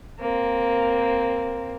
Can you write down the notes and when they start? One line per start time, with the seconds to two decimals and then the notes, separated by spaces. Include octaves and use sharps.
0.19 A#3 C4